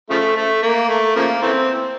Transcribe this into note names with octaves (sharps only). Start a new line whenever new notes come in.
C#3 F3 A3
A3
A#3
A3
C#3 F3 A#3
E3 A3 C4